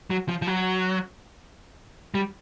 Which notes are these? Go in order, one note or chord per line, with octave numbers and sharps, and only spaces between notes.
F#3
F3
F3
F#3
G3